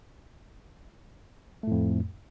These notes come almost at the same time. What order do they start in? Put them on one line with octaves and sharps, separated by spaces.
A3 A2 F2